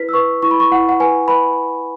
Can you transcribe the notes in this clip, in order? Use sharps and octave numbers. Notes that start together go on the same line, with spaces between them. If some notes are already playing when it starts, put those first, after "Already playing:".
Already playing: E4 B4 B6
E6
B4 C#6
E4 C#6
B5
C#6
E4 F#5
F#5
B4 G#5
B4 B5